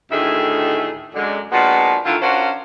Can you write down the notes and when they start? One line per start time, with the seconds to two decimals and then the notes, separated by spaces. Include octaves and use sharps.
0.12 D2 A2 D#3 A3 G#4 E5
1.15 F#2 D3 G#3
1.52 A#2 F3 G#3 B3 D4 F#4
2.05 D3 D#3 A3 E4 F4
2.22 C#4 D4 F4 F#4 A#4 C5